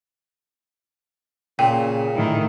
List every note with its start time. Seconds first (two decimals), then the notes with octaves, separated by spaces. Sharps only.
1.59 A#2 C#3 G5
2.15 A2 D#3 E4